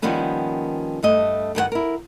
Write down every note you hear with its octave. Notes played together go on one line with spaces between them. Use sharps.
D#3 F3 G3 A#3 B3 C#4
G2 A3 D#5
G2 D#3 A#4 F#5
E4 A#4